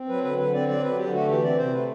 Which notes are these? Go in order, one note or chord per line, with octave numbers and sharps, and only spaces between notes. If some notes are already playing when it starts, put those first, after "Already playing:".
Already playing: C4
F#3 B4
D3 B4
D3 B4
C4 D5
F#3 D5
D3 B4
D3 G4
A3 F#4
E3 G4
C4 D5
C3 C5
A3 B4